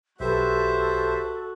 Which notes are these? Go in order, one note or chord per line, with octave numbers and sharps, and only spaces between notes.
B1 F#4 G4 A4 B4 C5 E5